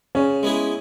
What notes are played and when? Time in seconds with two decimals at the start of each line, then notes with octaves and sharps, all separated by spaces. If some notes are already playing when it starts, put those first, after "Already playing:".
0.15 C#3 C#4
0.43 G#3 B3 E4 G#4